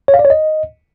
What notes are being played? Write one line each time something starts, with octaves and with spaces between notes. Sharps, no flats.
C#5
F5
D5
C#5
D#5